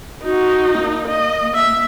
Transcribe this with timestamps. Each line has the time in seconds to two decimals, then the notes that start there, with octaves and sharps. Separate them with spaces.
0.23 D#4 F#4
0.79 A#3
1.08 D#5
1.54 E5